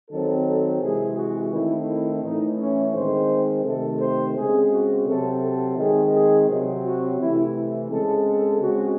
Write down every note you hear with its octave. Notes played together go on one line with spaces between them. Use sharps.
D#3 F#3 C4 A4
A4
C3 E3 G#3 G#4
F#4
D#3 A3 C4 E4
E4
A2 E3 A3 D#4
C#4
D#3 G#3 C4 C5
C3 D#3 A3 C4 A4
C5
C#3 G#3 C4 G#4
F#4
C3 F#3 C4 A4
A4
D#3 G#3 C4 G#4
G#4
C3 F#3 C4
F#4
C3 E3 A3 E4
C#3 G#3 C4 A4
A4
C#3 G#3 C4 F#4